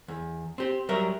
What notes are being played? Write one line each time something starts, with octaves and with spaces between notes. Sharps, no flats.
E2
C4 G4
F#3 G3 A#4 E5